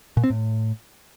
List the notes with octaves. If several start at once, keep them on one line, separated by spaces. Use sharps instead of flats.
A#2
C4
A2